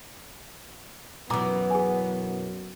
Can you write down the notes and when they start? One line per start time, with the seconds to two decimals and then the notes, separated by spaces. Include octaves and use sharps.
1.30 F#2 B2 E3 F#3 B3 F4 A#5 D6
1.71 G#4 G#5